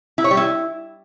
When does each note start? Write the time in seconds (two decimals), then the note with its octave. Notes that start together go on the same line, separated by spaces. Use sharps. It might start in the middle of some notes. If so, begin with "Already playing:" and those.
0.18 E4
0.24 C#5
0.31 G3
0.37 E4